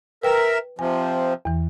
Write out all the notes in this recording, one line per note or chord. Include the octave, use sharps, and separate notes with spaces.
A#4 B4 E5 G5
C3 F3 G#5
E2 E3